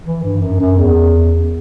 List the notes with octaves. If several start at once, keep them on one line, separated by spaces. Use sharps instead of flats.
E3
G2
F#2
F#2
E2